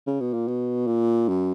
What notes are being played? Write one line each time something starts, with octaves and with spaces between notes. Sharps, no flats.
C#3
B2
A#2
B2
A#2
F#2